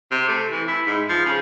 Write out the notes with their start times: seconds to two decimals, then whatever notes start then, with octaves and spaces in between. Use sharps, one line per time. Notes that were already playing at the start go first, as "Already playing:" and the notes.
0.11 C3
0.28 A3
0.51 E3
0.67 E4
0.86 G#2
1.09 F3
1.26 C#3